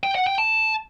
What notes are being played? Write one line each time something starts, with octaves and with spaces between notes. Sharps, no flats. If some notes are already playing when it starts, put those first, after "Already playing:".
G5
F#5
G5
A5